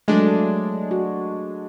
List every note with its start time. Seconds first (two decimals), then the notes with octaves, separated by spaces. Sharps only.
0.08 F#3 G#3 A3 D4
0.91 F#4